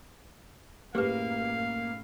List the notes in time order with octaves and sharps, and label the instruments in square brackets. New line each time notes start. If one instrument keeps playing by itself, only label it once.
[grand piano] F#2 A2 [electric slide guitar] A#3 [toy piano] G4 G#4 B4 [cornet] F5